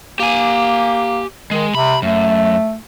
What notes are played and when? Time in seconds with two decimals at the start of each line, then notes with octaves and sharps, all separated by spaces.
0.20 A#3 G4 G#5
1.51 D#3 G#3
1.75 C3 B5
2.02 F#2 A3